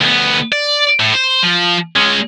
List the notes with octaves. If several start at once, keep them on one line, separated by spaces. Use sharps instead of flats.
D2 B3
D5
A2
C5
F3
G#3 C#4